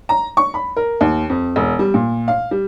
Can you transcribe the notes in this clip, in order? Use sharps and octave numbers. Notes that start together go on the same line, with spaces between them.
A#5
C#6
B5
A#4
D#2
F2
E1
G3
A#2
F5
G3